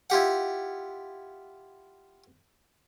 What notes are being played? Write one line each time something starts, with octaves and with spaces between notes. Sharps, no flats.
E4 F4 G4 F#5